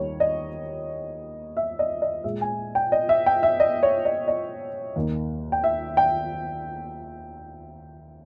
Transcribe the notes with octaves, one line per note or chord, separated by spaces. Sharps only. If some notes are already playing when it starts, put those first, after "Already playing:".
Already playing: D#2 D#3 G3 A#3 C#5
D#5
E5
D#5
D#5
A#2 G#3 E5
G#5
G5
D#5
E5
G5
E5
D#5
C#5
D#5
D#5
D#2 D#3 A#3
G5
E5
G5